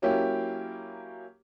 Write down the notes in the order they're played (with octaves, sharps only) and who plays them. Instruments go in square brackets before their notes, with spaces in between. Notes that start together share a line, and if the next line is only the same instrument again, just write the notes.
[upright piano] F#3 A#3 C#4 E4 G4